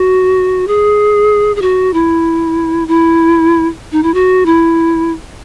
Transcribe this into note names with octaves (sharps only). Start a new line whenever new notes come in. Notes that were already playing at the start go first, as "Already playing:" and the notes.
Already playing: F#4
G#4
G#4
F#4
E4
E4
D#4
E4
F#4
E4